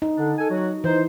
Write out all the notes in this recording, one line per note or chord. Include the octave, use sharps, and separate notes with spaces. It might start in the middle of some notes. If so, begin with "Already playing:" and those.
D#4
D3 D4
A4 G#5
F#3 F#4
E3 D#4 C5